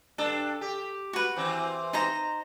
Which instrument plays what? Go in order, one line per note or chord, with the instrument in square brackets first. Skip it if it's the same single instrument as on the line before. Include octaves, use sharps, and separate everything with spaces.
[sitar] G2 D4 [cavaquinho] A4
[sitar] G4
[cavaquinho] F#4 B4
[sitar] E3 C4
[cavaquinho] D#4 C5 A#5